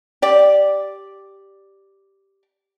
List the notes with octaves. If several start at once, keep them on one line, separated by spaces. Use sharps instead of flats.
G4 D5